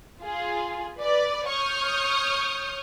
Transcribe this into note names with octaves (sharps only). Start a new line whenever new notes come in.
F4 G#4
B4 D5
C#5 C#6 D#6 F6 G6